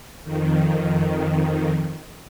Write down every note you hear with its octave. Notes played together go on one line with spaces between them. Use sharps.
F2 D#3